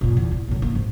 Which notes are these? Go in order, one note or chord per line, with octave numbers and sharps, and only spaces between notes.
G2 A#2
E2
E3
B1 A2
A#3 D#4
G#2 E3